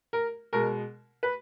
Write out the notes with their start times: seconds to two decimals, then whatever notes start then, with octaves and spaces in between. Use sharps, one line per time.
0.13 A#4
0.53 B2 G#3 A#4
1.23 B4